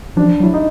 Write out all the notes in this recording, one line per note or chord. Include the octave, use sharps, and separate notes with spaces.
F3 D4
F#3
E4
D#4